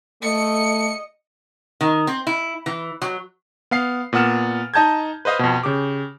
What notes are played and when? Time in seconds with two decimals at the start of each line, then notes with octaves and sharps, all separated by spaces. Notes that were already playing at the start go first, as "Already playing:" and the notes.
0.23 A3 D#5 C#7
1.81 D#3
2.07 C4
2.27 E4
2.66 E3
3.02 F#3
3.71 B3 F5 C7
4.13 A#2 B3 F#5 F6 E7
4.74 D#4 D#5 A5 G6 G#6
5.25 B4 C5 D#5 F5
5.39 F2 B2
5.63 C#3 G4 D6